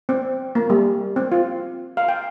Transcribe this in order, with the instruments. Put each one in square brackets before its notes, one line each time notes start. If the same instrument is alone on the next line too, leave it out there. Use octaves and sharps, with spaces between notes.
[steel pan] C4
A#3
G3
C4
F4
F5
G5